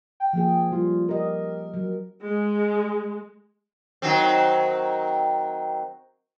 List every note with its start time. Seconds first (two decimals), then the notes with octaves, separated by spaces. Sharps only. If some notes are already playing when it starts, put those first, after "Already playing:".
0.20 G5
0.33 F3 A#3 G#4
0.72 G3 F4
1.09 G4 A#4 D#5
1.74 F#3
2.24 G#3
4.02 D#3 F#3 C4